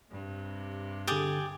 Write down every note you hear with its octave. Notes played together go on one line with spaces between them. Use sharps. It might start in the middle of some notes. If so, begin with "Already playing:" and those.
G2 C3
D3 G4 G#4 D6 A6